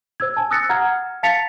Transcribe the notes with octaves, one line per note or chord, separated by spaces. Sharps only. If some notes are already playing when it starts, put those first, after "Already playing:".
C5 E6 G#6
G#5 A5
D#6 E6 F#6 A6 A#6 C#7
F#5 A#5 F6 G#6
F5 A5 A6 B6 C#7 F7